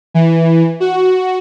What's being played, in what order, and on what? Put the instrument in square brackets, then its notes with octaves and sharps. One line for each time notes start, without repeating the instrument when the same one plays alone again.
[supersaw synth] E3
F#4